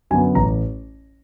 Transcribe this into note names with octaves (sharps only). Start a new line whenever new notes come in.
F#2 D3 F#3 B3 G#5
A1 A#5